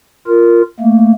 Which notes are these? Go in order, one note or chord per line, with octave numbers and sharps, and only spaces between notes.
F4 A#4
A3 A#3